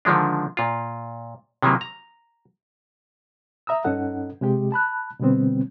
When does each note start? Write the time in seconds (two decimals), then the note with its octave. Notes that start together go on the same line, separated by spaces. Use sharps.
0.05 D3 D#3 F3 G#3 D4
0.57 A#2 F4
1.63 C3 D#3 E3 F#3 A#3
1.81 A#5
3.67 E5 A#5 D#6 E6
3.84 G2 C#4 D#4 A4 F#5
4.41 C3 G#3 G4
4.72 A5 B5 F#6
5.20 B2 D3 G3 B3 C4